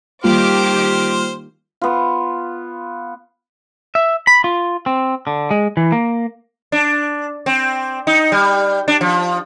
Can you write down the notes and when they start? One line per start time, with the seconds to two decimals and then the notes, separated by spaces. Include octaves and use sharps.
0.24 D#3 G3 A#3 F4 G4 C5 D6 F6
1.81 B3 F4
3.95 E5
4.27 B5
4.44 F4
4.86 C4
5.27 D3
5.51 G#3
5.77 E3
5.92 A#3
6.72 D4
7.46 C4
8.07 D#4
8.32 G3
8.88 D4
9.01 F3